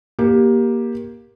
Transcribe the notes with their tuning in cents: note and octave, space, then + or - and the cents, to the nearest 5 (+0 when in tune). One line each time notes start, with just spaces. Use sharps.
A#3 +15 G4 +0